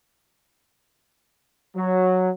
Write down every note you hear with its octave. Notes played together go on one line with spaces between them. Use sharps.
F#3